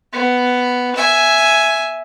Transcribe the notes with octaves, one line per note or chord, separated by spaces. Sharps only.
B3
E5 G#5